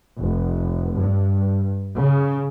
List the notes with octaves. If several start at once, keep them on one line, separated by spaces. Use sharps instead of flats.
F1
G2
C#3